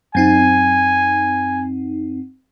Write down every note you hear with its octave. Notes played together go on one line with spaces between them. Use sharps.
F#2 C4 D#4 G#5